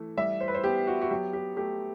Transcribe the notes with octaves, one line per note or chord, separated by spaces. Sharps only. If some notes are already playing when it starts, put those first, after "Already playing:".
Already playing: E3 A3
G3 E5
C5
B4
C5
B3 G4
F#4
F#4
F#3 G4
G4
A3 G4